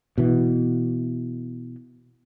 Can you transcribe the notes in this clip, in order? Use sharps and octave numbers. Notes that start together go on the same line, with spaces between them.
B2 E3